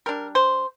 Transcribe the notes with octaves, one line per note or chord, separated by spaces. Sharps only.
G3 D4 A#4
C5